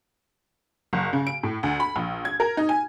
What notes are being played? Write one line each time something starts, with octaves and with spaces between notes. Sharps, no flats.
F#1
C#3
D7
A2
D2
B5
A#1
G#6
A#4
D#4
G#5